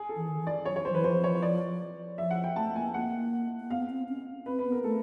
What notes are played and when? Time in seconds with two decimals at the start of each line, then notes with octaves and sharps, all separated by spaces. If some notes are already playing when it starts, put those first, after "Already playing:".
Already playing: G#4
0.09 A4
0.16 E3
0.28 D#3
0.41 E3
0.47 D5
0.65 F#3 C#5
0.76 C#5
0.85 C5
0.92 E3 B4
1.04 F3 C5
1.24 C#5
1.42 D5
2.18 F3 E5
2.31 F#5
2.44 G5
2.56 A3 A5
2.75 A#3 G#5
2.94 A#3 F#5
3.60 A#3
3.70 B3 F5
3.89 C4
4.09 C#4
4.46 C4 B4
4.59 B4
4.65 B3
4.72 A#4
4.84 A3 A4